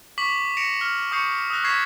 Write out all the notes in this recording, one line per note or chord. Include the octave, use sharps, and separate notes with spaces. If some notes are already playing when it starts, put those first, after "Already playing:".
C#6 D6 B6 F#7
A#6 C#7 D7 E7 F7
F6
C#6 D#6 G6 C7 C#7
D#6 E6 F#6 A#6
C#6 D#6 G#6 B6 C7 E7